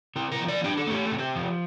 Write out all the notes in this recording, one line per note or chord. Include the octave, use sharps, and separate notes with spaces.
C3 A#4
A#4
F3
D5
D4 G4
A4
A3 G4
A4
C3
G4
F3